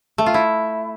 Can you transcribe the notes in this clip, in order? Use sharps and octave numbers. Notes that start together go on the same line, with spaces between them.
A3
F4
E4